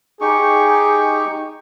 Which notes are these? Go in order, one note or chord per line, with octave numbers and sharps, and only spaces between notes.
D#4 G4 G#4 C#6